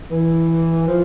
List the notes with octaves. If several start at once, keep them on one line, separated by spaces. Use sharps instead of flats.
E3
F3